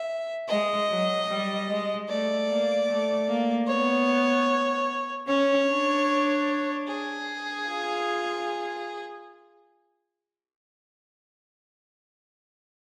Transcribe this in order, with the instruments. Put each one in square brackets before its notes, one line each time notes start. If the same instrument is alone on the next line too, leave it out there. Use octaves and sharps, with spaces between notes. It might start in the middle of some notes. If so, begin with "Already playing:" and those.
Already playing: [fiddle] E5
[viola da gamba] G#3 [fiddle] D#5
[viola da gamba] F#3
G3
G#3
[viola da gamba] A3 [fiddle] D5
[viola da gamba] A#3
A3
A#3
[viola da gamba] B3 [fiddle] C#5
[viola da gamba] C#4 [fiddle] C#5
[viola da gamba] D4
[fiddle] G#4
[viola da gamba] F4